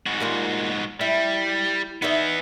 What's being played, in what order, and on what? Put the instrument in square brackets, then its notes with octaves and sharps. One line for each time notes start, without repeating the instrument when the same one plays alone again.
[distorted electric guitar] G#2 F#4
[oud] G3 A#3 F4
[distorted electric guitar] G3 [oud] E4
[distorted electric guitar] E3 B3 [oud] D#4 D5 E5